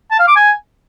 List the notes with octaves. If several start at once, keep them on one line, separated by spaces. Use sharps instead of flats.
A5
F5
D6
G#5